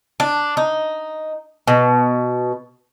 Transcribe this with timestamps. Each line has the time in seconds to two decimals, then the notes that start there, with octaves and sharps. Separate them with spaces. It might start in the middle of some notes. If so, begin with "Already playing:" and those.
0.20 D4
0.57 D#4
1.68 B2